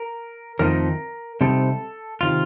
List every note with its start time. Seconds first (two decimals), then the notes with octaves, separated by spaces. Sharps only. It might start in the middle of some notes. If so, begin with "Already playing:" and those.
Already playing: A#4
0.59 F2 D#3 A3 C4 D#4 A#4
1.41 C3 G3 C4 D#4 A4
2.21 C3 D#3 F4